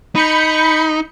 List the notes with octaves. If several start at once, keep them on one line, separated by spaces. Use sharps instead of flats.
D#4 B5 G6 C#7